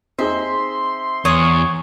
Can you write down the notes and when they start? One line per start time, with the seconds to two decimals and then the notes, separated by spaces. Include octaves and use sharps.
0.19 C4 D#4 G#4 E5 C6
1.25 E2 C#5 D#6